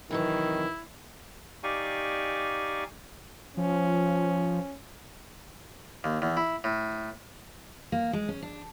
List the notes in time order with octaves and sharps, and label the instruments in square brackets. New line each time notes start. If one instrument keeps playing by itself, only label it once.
[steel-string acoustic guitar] C3 E3 F#3 [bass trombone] D#3 [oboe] E4
[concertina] D#4 G4 D5 F5 G#5 C#6
[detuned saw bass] F3 [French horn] C#4
[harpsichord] D#2
E2
E4
A2
[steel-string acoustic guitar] A#3
G#3
C#4
D4